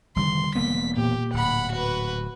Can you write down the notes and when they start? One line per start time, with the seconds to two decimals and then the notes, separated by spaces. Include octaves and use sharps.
0.16 F1 D3 D#3 G3 C6
0.55 E1 A#3 B3 B6
0.97 A#2 G4
1.34 D1 F#5 B5
1.73 F#4 B4